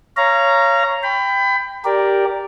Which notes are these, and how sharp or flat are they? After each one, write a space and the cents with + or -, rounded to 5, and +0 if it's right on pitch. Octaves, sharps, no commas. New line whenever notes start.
C#5 +0 F5 -30 A#5 +0
G5 +10 B5 +30
G4 +0 A#4 +0 D5 +0